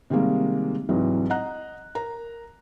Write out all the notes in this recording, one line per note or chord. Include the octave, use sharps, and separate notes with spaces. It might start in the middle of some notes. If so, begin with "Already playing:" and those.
C3 D#3 G3 G#3 A#3
C2 G#2 E3 F#3
D#5 F#5 A#5 F#6
A#4 A#5